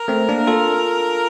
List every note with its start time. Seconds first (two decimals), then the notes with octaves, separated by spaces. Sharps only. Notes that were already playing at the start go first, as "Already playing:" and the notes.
Already playing: A#4
0.08 A3 C4
0.29 A#3 D4
0.47 F4 A4